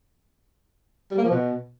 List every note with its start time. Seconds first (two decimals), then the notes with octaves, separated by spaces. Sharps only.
1.11 G3
1.18 A#3
1.25 F3
1.31 B2